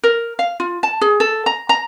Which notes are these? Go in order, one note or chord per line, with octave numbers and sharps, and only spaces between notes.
A#4
F5
F4
A5
G#4
A4
A#5
A#5